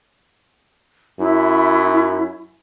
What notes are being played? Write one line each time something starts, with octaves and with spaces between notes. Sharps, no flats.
F#2 E4